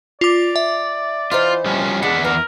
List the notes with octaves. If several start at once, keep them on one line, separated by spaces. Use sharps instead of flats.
F4 D5 D6
E5
E3 D#4 F4 C5
F3 G3 C#4
E2 G#3 D5 F#5 B5
A#4 B4